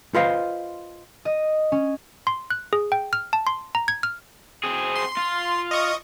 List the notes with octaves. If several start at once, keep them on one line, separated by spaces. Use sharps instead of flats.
F4 B4 C5 D#5 F5
D#5
C#4
C6
F#6
G#4
G5
F6
A5
C6
A#5
G#6
F6
C4 G#4
C6
F4
D#5 C#6 D#6